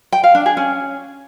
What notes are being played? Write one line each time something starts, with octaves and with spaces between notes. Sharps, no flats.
G5
F5
D4
G#4
C#4